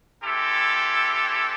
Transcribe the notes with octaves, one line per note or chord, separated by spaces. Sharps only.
G#3 C4 E4 G4 A4